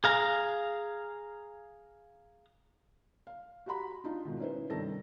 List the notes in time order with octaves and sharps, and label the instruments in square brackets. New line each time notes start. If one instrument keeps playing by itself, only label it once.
[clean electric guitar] G#4 F5 A#5
[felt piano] F5
F#4 G4 F#5 A#5 B5
D4 D#4 F4
G#2 B2 D#3
C#4 D#4 E4 B4 C5
C2 G2 D#3 A4 A#6